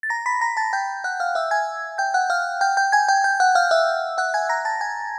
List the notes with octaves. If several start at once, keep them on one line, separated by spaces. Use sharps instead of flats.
A6
A#5 A#6
B5 B6
A#5 A#6
A5 A6
G5 G6
F#5 F#6
F5 F6
E5 E6
G#5 G#6
G5 G6
F#5 F#6
F5 F6
G5 G6
G5 G6
G#5 G#6
G5 G6
G5 G6
F#5 F#6
F5 F6
E5 E6
F#5 F#6
G#5 G#6
A#5 A#6
A5 A6
G#5 G#6